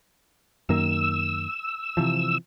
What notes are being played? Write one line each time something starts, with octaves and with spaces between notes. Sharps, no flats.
F#2 D#3 A#3 E6
C3 E3 F3